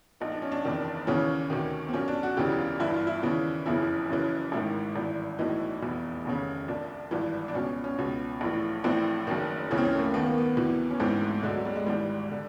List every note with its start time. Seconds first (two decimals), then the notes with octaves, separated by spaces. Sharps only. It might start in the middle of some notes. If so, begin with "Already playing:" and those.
0.20 A#1 A#2 D#4
0.32 D4
0.42 C#4
0.52 D4
0.65 F#1 E2 C3 D#3
1.07 D#2 C#3 E3 C#4
1.50 D2 C3 D#3
1.88 C4
1.93 B1 A#2 C#4
2.08 D4
2.23 F#4
2.37 E1 D2 C#3 E3 G4
2.59 F4
2.80 G1 G2 E3 E4
2.94 F4
3.07 E4
3.23 D#2 C#3 E3
3.66 F#1 F2 C#3 E3 E4
4.09 F#1 F#2 C#3 E3
4.52 A1 G#2 D#3 E4
4.96 G#1 G2 E3
5.39 B1 A2 E3 D#4
5.82 F1 E2 B2
6.25 F1 D#2 C#3
6.68 C2 A#2 D4
7.11 G#1 G2 E3
7.48 D4
7.54 C#2 B2 C#4
7.84 C#4
7.98 C#2 B2
8.41 A#1 A2 E3
8.84 A#1 A2 E3 C4
9.27 F#1 F#2 D#3
9.71 C#2 C#3 E3 C#4
9.78 C4
9.85 C#4
9.95 A3
9.99 A#3
10.14 D#2 D#3 B3
10.26 A#3
10.38 B3
10.57 D2 C3 E3
10.91 C#4
11.00 A1 G#2 E3 C4
11.22 A3
11.43 D2 D3 G#3
11.54 F#3
11.65 G3
11.76 G#3
11.86 G#1 G#2 E3 G3
12.31 D3